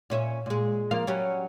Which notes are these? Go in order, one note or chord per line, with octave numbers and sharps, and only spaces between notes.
A#2 C#4 E5
A#2 G#3
F3 A#3 F5
F#3 G3 C#4